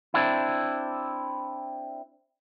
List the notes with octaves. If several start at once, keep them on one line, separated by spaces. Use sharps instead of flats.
C4 D4 E4